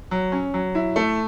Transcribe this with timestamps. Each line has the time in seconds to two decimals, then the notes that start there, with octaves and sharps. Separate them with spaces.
0.11 F#3
0.32 C#4
0.54 F#3
0.75 E4
0.96 A3